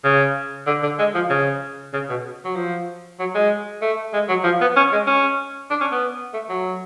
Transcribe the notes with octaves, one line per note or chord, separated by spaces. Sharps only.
C#3
D3
D3
G#3
F3
C#3
C#3
B2
F#3
F3
F#3
G#3
A3
G#3
F#3
F3
B3
C#4
G#3
C#4
D4
C#4
B3
A3
F#3